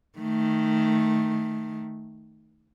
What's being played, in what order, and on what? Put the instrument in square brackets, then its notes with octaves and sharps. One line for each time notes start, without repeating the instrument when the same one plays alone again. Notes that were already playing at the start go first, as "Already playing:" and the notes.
[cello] D#3 A3